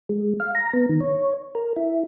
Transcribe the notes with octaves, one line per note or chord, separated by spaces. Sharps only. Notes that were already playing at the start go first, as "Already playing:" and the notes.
G#3
F5
A#5
B3
D#3
C#5
A#4
E4